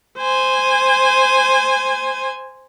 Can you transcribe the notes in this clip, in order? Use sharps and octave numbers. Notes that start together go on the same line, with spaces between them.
C5 G#5